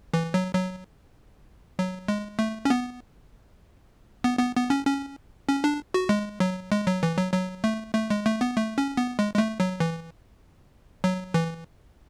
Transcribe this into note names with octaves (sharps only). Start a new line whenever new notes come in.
E3
F#3
F#3
F#3
G#3
A3
C#4
B3
B3
B3
B3
C#4
C#4
C#4
D4
F#4
G#3
F#3
G#3
F#3
E3
F#3
F#3
A3
A3
G#3
A3
B3
A3
C#4
B3
G#3
G#3
A3
F#3
E3
F#3
E3